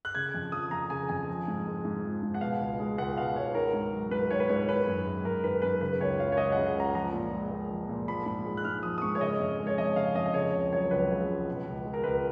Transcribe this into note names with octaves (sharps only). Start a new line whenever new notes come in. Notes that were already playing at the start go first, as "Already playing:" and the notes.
F#6
C#3 G#6
F2
F3 D#6
F2 A#5
C#3 G#5
F2 G#5
F3
G#2
G#3
G#2
F3
G#2
F#5
B2 F5
C#2
G#3
C#2 F#5
B2 F5
C#2 C#5
D#3 A#4
G#2
F#3
G#2 B4
D#3 C#5
B4
G#2 C#5
D#3 B4
F#2
G#3
F#2 A#4
D#3 B4
F#2 B4
C#3 B4
C#2 C#5
F#3 F5
C#5
C#2 D#5
C#3 F#5
F#5
C#2 A#5
F3 A#5
A#2
G#3
A#2
F3
A#2
F3 B5
G#2
G#3
F#6
G#2 F6
F3 D#6
D#6
G#2 C#6
C#5
C#3 D#5
F2
G#3
C#5
F2 D#5
C#3 F5
F2 D#5
D#5
C#3 C#5
C#2
F#3 C#5
C#2 B4
C#3
C#2
B2
C#2
G#3
A#4
C#2 B4